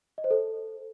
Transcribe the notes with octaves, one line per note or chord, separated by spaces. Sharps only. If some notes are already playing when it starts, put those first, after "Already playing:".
D#5
C5
A4